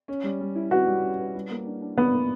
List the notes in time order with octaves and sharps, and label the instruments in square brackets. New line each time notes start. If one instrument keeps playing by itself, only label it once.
[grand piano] C#4
G3
G3
E4
[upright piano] F#4 [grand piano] B4
[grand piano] G3
C#4
B4
G3
A#3
D4
D4
[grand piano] A#3 [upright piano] B3
[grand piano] A#3